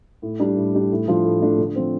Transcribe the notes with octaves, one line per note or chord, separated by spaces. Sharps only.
A2
G3 D4 G4
A2
G3 D4 G4
A2
F3 A3 D4 F4
A2
F3 A3 D4 F4
D3
F3 C4